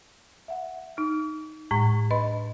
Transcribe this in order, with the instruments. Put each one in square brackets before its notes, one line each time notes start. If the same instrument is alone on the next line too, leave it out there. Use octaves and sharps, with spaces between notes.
[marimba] E5 F#5
D#4 F6
A2 G#3 C#6
D4 B4 D#5 B5 C6